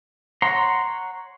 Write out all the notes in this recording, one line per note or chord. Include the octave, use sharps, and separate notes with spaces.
C#5 F#5 A#5 C6